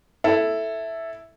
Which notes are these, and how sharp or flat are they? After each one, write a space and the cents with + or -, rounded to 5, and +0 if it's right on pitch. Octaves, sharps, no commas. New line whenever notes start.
E4 +0 A4 +0